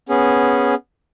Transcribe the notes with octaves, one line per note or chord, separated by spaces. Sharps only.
B3 C#4 G#4